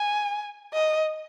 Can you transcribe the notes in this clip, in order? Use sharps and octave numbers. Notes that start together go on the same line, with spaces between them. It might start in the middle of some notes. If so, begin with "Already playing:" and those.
Already playing: G#5
D#5